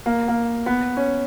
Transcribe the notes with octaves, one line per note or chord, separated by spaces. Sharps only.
A#3
A#3
B3
C#4